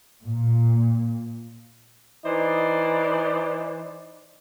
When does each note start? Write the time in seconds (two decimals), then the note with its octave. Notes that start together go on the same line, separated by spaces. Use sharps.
0.23 A#2
2.26 E3 D#4 C5 D5